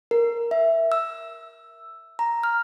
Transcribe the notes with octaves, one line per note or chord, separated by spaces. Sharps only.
A#4
E5
E6
A#5
F6